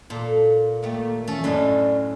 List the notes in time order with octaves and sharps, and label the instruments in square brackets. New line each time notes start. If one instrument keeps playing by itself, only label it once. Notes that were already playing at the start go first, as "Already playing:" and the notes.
[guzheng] A#2 [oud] A4
[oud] D#3 A3 G4 [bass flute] A#3
[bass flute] E3 [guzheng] A3 C#4 A4
[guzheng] F#2 A2 F#3 [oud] D4 D#5 [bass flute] D5